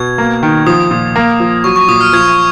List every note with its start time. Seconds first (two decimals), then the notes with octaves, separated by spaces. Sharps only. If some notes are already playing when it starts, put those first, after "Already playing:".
Already playing: B2 G#6
0.18 A#3
0.43 D#3
0.67 F3 D#6
0.91 A#2
1.16 A#3
1.40 F3
1.64 F#3 C#6
1.76 C#6
1.88 A#2 D#6
2.01 F6
2.13 F3 G#6